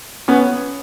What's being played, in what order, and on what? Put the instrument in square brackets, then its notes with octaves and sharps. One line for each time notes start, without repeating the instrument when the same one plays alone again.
[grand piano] B3 C#4